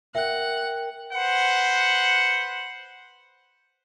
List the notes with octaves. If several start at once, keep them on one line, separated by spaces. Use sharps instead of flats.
A#4 E5 F#5 G5
B4 C5 F#5